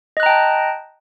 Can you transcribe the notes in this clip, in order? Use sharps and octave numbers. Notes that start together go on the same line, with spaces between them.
D#5 G5 A5 A#5 F#6